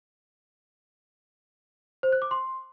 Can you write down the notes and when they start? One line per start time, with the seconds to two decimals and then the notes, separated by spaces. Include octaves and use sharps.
2.03 C5
2.12 F#6
2.22 D6
2.31 C6